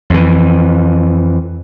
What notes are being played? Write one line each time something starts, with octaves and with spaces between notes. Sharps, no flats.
F2 E3